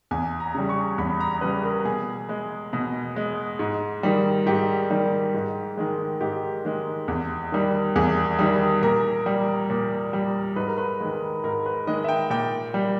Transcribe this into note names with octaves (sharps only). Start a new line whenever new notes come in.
E2 G#5
A#5
C#3 G3
C#6
E2 B5
A#5
C#3 G3 B4
A#4
B2 G#4
G#3
B2
G#3
G#2
D#3 G3
G#2 G4
D#3 G3
G#2
D#3 G#3
G#2 G4
D#3 G#3
E2
D#3 G3
E2 G#4
D#3 G3
A#2 A#4
G3
A#2
G3
G#2 B4
A#4
B4
D#3 G#3
G#2 A#4
B4
D#3 G#3 D#5
E5
G5
A#2 G5
G3